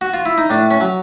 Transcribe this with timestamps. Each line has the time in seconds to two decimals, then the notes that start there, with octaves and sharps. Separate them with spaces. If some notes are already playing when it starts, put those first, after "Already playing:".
0.01 F#4
0.14 F4
0.26 E4
0.38 D#4
0.50 A2 D4
0.71 C#4
0.81 F#3